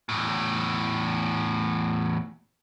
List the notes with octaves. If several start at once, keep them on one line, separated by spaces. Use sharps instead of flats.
E2 A2